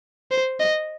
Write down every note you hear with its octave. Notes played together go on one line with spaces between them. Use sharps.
C5
D#5